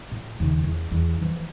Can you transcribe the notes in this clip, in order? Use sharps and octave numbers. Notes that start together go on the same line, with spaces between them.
A2
D#2 C#3
E2
E2
E3 F3